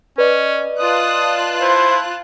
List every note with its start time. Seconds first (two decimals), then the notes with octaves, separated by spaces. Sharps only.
0.18 C#4 B4 D5 D#5
0.79 F4 A5 D#6 F#6
1.61 E4 C5